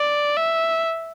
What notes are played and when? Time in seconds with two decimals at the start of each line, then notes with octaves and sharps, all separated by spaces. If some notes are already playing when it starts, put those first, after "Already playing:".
Already playing: D5
0.37 E5